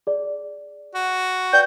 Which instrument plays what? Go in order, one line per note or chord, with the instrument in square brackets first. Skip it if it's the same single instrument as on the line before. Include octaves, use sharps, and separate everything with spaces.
[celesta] G#4 D5
[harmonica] F#4
[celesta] B4 D5 G5 [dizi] G6